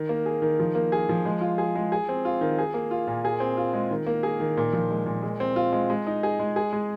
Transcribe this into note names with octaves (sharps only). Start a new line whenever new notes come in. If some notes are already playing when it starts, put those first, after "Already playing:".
Already playing: D#3
A#3
G#4
D#3
F3
A#3
G#4
F3
G#3
F4
G#4
G#3
G#4
C4
F4
D#3
G#4
A#3
F4
A#2
G#4
C4
F4
G#3
D#3
A#3
G#4
D#3
A#2
F3
G#3
A#2
G#3
C4
F4
G#3
G#3
D#4
G#4
G#3
G#4
G#3